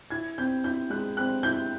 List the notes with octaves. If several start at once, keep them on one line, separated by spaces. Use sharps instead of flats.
E4 G#6
C4 G6
E4 G6
G#3 F#6
C4 F#6
E4 G6